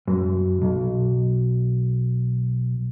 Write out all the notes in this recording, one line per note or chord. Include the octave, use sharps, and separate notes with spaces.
F#2
B1